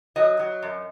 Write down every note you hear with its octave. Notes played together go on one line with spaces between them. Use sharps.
F#3 D#5
F#3
F#2